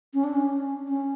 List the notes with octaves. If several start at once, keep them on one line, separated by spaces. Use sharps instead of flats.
C#4
D4
C#4
C#4